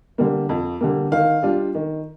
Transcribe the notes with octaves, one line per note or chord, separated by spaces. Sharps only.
D3 G3 A#3
F2
D3 G3 A#3
D#3 F5
G3 D4 F4
D#3